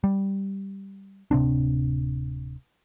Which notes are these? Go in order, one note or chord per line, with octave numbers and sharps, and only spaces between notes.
G3
D1 C3 C4 D4